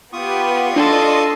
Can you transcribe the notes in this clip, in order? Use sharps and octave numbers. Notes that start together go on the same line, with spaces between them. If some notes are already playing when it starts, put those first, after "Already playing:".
B3 F4 G4 B4 C#6 D#6
D4 A4 D5 D#5 C6